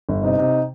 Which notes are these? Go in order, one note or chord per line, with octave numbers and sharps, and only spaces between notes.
G1
C3 D#4
C3